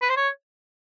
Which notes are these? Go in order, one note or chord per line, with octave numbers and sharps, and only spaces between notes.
B4
C5
C#5